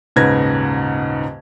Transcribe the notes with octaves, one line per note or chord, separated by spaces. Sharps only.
D#1 G#2 C#3 B4 G#6 A#6